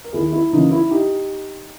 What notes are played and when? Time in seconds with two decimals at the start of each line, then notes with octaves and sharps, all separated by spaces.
0.04 A#4
0.13 D#2 E4 G#4
0.33 E4
0.52 C#3 E3 A#3 C#4 D#4
0.71 E4
0.91 D#4 G4